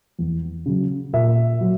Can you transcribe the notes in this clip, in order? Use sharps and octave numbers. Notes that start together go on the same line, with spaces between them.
E2
C#3 F#3
A#2 E5
F#3